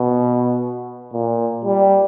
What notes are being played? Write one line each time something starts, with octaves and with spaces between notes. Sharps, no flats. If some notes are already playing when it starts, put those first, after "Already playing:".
Already playing: B2
A#2
G3